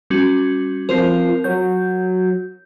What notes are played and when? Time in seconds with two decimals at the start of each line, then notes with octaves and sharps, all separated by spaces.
0.10 G3 C#4 F#4
0.89 F3 C4 F4 A#4
1.44 F#3 G6